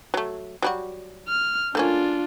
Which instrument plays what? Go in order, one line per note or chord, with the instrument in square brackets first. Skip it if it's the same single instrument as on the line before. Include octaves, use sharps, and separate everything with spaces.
[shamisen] F#3 A3
F#3 G3 F#4
[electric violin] F6
[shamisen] A3 A#3 C#4 [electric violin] D4 F4